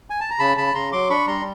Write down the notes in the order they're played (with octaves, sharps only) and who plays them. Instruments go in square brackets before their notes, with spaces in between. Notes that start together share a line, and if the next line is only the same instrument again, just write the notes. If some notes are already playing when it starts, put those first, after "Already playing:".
[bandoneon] G#5
A5
A#5
C#3 A5 B5
C#3 A5 B5
C#3 A#5 C6
F#3 C6 D6
D4 B5 C#6
G3 A#5 C6